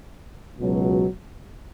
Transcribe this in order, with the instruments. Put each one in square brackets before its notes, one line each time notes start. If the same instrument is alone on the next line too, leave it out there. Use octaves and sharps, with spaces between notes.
[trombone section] C#2 B2 F#3